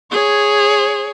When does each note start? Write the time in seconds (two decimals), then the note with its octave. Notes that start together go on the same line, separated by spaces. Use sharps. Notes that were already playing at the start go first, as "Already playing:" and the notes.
0.11 G#4 C#5